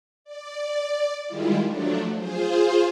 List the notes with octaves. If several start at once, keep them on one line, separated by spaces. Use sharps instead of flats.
D5
D#3 G3 G#3 E4 F4
F3 F#3 A3 D4
F4 G#4 C5